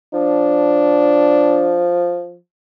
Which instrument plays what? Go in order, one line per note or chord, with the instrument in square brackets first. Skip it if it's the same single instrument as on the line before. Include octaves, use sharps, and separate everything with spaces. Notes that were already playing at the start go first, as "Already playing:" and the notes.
[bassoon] F3 [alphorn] D4